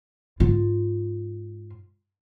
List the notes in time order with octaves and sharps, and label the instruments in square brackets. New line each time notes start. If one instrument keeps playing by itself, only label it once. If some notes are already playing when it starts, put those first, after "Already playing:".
[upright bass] G#2 F4